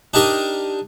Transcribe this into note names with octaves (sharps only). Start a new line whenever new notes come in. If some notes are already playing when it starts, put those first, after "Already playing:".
D4 D#4 G4 A#4 D#6